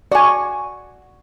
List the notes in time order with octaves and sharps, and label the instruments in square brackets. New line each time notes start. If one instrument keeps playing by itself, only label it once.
[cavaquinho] F#4 C#6 [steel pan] D5 G#5